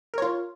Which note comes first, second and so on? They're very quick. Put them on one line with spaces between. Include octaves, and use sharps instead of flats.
A#4 C#5 F4